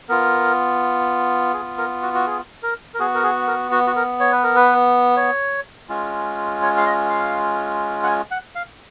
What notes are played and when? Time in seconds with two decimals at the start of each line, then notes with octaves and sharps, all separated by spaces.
0.09 B3 F4 A#4
1.54 G#4
1.78 A#4
2.02 F#4
2.14 F#4
2.27 G#4
2.63 A#4
2.94 A#4
2.99 B3 F#4 G#4
3.15 A#4
3.23 G#4
3.47 A#4
3.72 F#4
3.87 F#4
3.96 A#4
4.20 C#5
4.32 B4
4.44 A#4
4.56 B4
5.17 C#5
5.89 G#3 C#4 F4
6.62 C#5
6.77 F5
6.86 D#5
7.10 F5
8.03 F#5
8.07 G#5
8.31 F#5
8.55 F5